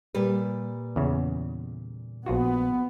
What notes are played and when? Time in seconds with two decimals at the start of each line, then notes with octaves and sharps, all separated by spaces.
0.15 A#2 G3 B4
0.96 E2 C#3
2.26 A#1 B3 F4 F#4